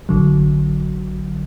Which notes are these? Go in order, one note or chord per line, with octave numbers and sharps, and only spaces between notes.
A1 D3 F#3